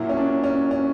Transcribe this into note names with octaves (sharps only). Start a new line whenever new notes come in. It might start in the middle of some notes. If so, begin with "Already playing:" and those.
Already playing: A#2 F#3 A#3 E4
C#4
D4
C#4
C#4